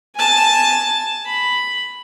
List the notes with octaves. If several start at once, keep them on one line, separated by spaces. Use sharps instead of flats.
G#5 A5
B5